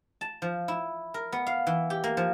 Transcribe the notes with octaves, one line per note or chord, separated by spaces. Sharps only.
A5
F3
E4
A#4
B3
F5
E3
G4
A#3
F3